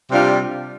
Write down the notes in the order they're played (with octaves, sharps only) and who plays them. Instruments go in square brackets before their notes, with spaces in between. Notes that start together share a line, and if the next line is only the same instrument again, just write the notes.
[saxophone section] C3 G3 D4 F4